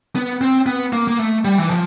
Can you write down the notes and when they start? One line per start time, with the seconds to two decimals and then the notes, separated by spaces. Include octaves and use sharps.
0.16 B3
0.41 C4
0.66 B3
0.93 A#3
1.08 A#3
1.19 A3
1.45 G3
1.58 E3
1.70 F3